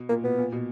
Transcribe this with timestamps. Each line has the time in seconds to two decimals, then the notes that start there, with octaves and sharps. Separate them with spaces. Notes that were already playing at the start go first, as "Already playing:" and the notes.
Already playing: B2
0.09 A#2 A#3
0.24 B2 B3
0.39 A#2
0.52 B2